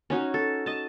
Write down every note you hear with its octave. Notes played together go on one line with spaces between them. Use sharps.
C#4 D#4 F#4
A4
D#5 A5